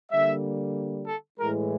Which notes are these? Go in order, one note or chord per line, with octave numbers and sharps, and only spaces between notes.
D3 G3 A#3 E5
A4
A2 E3 G#3 A#4